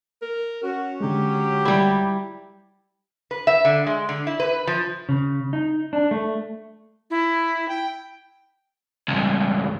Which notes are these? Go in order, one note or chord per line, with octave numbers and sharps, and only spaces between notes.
A#4
C#4 F#4
D3 F#3 G#3 G4
G3 E4
B4
E5
D3
G#3
D3
E4
B4
F3
C#3
D#4
D4
A3
E4
G5
C#2 G2